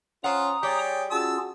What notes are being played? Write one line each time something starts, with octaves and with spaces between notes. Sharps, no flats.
C#4 F4 C5 F#5 A#5 D#6
G3 G#4 C#5 D5 G5
C#4 F4 F#4 G#4 A5 E6